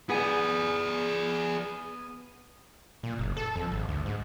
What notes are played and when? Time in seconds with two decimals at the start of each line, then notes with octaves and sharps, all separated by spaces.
0.10 B3 G#4 D5 G#5
3.03 A#2
3.19 F#1
3.37 A4
3.56 F2
3.72 G#1
3.88 D2
4.06 G#2